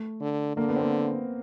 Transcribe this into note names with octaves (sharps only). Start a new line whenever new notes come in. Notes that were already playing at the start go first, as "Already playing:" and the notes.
Already playing: A3
D3
D3 A#3
B3
C4
B3